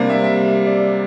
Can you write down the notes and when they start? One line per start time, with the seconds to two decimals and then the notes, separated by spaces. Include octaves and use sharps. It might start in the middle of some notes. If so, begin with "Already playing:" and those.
Already playing: C3 G3 A#3 D4
0.10 E5
0.24 E5
0.66 D5